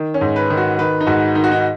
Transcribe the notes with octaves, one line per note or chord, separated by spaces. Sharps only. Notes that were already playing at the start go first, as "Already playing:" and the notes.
Already playing: D#3
C#4
G#2
B4
D#3
F#4
D#3 B4
D#4
G#2 F#4
D#3 D#4
F#4
D#4